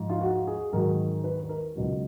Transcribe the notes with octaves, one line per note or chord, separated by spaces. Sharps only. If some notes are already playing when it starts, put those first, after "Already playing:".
Already playing: G#2 F3
F4
F#4
G#4
G#2 D#3 F#3 A#4
B4
B4
A#4
C#2 B2 F#3